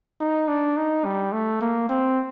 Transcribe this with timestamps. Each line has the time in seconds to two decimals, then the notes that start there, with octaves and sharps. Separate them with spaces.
0.21 D#4
0.48 D4
0.77 D#4
1.05 G3
1.33 A3
1.61 A#3
1.89 C4